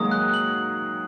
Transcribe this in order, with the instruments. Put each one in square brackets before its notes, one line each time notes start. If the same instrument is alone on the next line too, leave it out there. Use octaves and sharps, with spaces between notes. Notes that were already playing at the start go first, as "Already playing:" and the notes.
Already playing: [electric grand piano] D#3 F#3 G#3 A#3 [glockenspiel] D#6
[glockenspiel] F#6
F#7